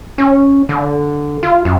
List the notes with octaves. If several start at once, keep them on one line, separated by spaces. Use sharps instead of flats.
C#4
D3
F4
F#2